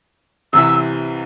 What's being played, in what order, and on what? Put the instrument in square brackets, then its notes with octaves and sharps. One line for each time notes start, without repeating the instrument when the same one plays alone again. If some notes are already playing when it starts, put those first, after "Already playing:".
[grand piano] C2 C3 E3 [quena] E6